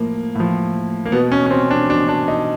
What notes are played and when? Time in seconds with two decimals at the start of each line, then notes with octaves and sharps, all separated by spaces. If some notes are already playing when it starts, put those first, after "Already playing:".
Already playing: A2 F3 A#3
0.35 A2 F3
1.05 A#3
1.12 B2 B3
1.32 C#4
1.46 C#4
1.51 C4
1.71 D4
1.89 B2 D4
2.08 D4
2.28 D#4